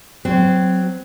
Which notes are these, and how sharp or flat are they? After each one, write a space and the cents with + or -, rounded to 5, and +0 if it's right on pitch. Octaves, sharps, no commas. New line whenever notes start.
F#3 +0 C4 -20